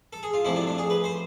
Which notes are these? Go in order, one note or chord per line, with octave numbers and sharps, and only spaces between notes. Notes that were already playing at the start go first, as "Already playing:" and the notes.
A4
G#4
F4
F2 C3 F3 A3 E4
D4
D4
G#4
B4
C5